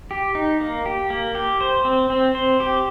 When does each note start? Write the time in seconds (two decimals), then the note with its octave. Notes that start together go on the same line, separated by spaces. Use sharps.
0.11 G4
0.35 D#4
0.61 A#3
0.86 G4
1.10 A#3
1.35 G4
1.61 C5
1.85 C4
2.10 C4
2.35 C5
2.60 G4